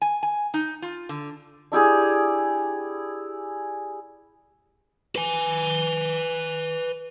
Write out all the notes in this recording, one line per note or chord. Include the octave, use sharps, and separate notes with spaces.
G#5
G#5
D#4
F4
D3
D4 E4 G4 G#4
B4 G#5